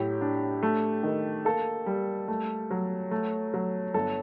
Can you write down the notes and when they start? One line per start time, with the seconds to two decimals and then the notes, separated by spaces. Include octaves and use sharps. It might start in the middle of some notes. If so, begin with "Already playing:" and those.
Already playing: A2 F#3 G4
0.21 D4
0.63 A3
1.03 D#3
1.45 A#3 A4
1.86 G3
2.28 A3
2.71 F#3
3.11 A3
3.54 F#3
3.94 G1 A4